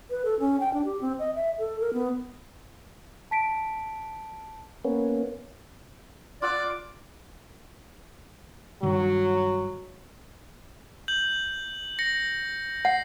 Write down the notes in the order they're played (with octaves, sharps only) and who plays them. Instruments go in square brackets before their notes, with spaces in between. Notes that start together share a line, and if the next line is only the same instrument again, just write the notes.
[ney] B4
A4
C#4
G5
D4
G4
C4
D#5
E5
A4
A#4
B3
[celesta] A5 B6 D7
[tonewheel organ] A#3 B3 C#4
[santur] F4 F#5 E6 [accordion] D5 [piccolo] D6
[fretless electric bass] G2 D#3 G3 [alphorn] F#3
[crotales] G6 F#7
A#6 C#7
[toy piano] F#5 [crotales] C7